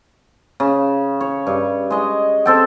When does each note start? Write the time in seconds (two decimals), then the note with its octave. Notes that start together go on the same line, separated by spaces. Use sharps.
0.60 C#3
1.21 C#5
1.47 G2
1.91 G#3 D#5
2.46 C4 A4 G5